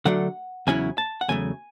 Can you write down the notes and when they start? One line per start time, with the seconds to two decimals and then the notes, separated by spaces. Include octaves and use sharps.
0.05 D3 F#3 A3 D4 F#5
0.67 E2 C#3 F#3 C#4 E4 G#5
0.98 A5
1.21 F#5
1.28 E2 C#3 F#3 A3 G#5